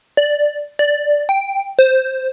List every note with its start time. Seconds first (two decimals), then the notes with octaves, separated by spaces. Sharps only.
0.17 D5
0.79 D5
1.29 G5
1.79 C5